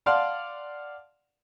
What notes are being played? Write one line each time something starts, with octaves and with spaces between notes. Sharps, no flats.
D5 F5 F#5 A5 C6 F6